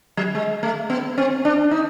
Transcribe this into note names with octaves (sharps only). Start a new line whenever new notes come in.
F#3
G#3
A3
B3
C4
D4
D#4